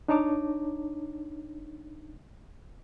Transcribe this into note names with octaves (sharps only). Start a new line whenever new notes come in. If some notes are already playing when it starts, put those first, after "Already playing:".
D4 D#4 C#5 A5 D6